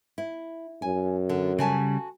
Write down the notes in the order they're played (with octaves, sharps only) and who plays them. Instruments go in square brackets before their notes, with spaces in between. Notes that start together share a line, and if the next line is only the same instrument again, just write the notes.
[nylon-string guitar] E4
[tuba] F#2 [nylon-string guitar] G#5
[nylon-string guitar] D3
[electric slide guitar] C#3 G3 [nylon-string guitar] F#4 G#5 A5